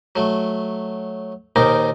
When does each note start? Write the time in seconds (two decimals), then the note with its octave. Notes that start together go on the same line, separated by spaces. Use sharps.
0.16 F#3 A3
1.56 D#2 A#2 C4 D#4 A#4 D6